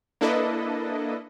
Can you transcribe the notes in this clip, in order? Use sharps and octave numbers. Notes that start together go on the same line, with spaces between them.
A#3 D4 E4 A4 B4 D#5